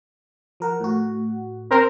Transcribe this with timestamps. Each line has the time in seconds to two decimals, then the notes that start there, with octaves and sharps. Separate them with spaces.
0.60 F3 A#4 F#5
0.80 A2 F#4
1.71 C4 A#4